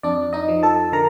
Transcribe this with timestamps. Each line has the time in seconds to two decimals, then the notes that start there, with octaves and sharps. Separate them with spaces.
0.03 F2 D4 D5
0.33 D#4 D#5
0.48 F3
0.63 A4 A5
0.92 D3 A#4 A#5